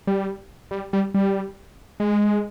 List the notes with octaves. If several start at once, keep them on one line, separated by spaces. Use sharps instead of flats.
G3
G3
G3
G3
G#3